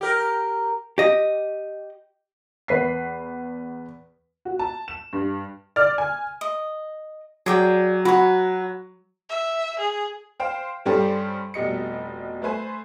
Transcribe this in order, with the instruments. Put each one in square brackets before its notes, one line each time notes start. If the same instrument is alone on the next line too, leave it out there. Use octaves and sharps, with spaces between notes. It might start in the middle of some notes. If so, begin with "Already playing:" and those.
[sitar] G4 A#4
[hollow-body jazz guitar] G4 D#5
[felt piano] E2 B4 B6 C7
[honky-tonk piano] F#4
A5
E7
G2
D5 F6
G#5
[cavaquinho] D#5
[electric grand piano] F#3 [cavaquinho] G#4 D5 G5
[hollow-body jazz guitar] F#4 [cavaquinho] B4 C#5
[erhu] E5
G#4
[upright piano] C5 F5 G5
G2 G3 C#4 G4 A4 C5
F1 B2 G3 D#5 C#7
A3 B4 C5 G#5